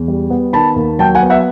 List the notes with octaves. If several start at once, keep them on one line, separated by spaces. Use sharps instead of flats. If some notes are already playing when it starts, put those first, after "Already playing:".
Already playing: E2
G3
B3
D#3 A5 B5
D#2
F#3 G5 A5
F#5 G#5
B3
E5 F#5